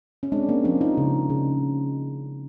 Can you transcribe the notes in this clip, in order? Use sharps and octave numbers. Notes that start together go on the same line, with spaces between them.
C#4
G#3 C4 D4
A#3 C4
F3 C4 D4
D#4 F4
C#3
C#3